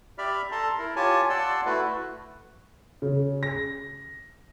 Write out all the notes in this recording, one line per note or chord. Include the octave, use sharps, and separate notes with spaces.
G4 D5 E5 B5 F6
A4 A5 A#5 C6
E4 A#4
F4 G4 C#5 G#5 A5
D5 F#5 A5 C6 E6
A3 E4 F#4 B4
C#3
A#6